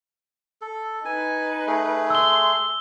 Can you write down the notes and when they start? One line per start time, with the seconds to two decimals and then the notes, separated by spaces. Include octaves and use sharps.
0.62 A4
1.05 D#4 B4 G#5
1.67 A3 G#4
2.10 C6 E6 G7